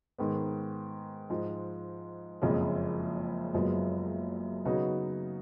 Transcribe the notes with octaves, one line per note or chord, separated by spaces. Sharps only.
G#2 D#3 G#3 B3
G#2 F3 G#3
F#1 F2 C#3 F3 G#3
F#1 F#2 F3 G#3 B3
C#3 F#3 B3 D#4 F#4